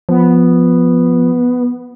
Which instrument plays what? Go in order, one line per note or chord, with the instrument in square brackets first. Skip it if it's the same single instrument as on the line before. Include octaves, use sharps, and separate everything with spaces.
[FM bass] F3 [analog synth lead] B3